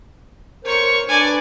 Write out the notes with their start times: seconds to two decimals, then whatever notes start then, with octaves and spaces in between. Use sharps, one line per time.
0.65 A#4 C5 C#5 C#6
1.08 D4 B4 D5 G#5